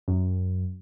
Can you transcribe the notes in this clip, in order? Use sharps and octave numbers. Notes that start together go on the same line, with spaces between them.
F#2